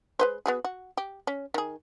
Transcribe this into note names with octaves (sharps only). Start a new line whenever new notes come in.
G#3 B4 C5
B3 F#4 G#4
F#4
G4
C#4
D#3 G#4